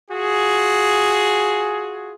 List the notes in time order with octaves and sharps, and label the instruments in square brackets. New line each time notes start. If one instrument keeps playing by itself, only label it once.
[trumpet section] F4 F#4 G#4